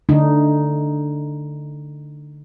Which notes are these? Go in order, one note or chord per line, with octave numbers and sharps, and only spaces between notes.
D3 A3 D4 D#4